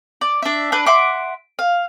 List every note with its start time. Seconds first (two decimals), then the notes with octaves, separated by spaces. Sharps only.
0.21 D5
0.42 D4 E5
0.72 D4 B4
0.86 E5 F#5 C6 D6
1.59 F5